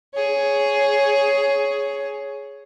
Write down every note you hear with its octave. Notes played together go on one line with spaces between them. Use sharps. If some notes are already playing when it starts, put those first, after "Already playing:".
G#4 C#5